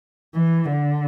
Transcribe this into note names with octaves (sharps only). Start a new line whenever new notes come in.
E3
D3